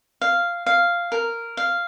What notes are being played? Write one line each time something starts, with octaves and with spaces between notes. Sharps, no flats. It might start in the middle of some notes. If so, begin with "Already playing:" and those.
F5
F5
A#4
F5